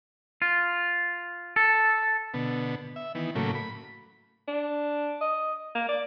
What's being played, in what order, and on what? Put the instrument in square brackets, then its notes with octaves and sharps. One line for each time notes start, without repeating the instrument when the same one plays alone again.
[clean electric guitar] F4
A4
[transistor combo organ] B2 D3 B3
E5
D#3 E3 B3
A2 C#3 F#3 A3 A#3
B5
[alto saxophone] D4
D#5
A#3
D5